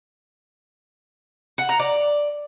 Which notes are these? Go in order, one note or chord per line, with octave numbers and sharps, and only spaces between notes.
F#5
A#5
D5